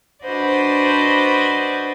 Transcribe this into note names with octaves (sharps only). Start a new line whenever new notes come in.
D4 F#4 B4 C5 D5 D#5